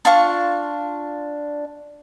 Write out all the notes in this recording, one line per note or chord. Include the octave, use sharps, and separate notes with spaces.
D4 F4 C#6